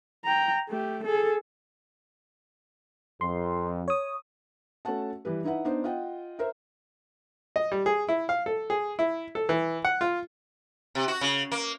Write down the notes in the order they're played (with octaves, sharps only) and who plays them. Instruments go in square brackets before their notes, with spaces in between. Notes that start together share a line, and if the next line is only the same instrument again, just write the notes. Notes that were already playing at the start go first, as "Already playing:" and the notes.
[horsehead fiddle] G5 A#5
A3 G4
G#4 A4
[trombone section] F2 [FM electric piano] C6
[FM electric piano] C#5 D#6
[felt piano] A3 C#4 F#4 F#5 A5
E3 G3 B4
D#4 E4 B4 F#5
B3 D4 D#4 C5
F4 D#5 F#5 G5
A#4 C5 E5
[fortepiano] D#5
G3
G#4
E4
F5
A4
G#4
E4
A4
E3
F#5
F4
[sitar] C3
F#4
C#3
A#3